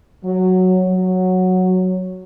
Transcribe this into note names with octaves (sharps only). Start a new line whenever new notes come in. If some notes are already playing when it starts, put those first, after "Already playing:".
F#3
F#3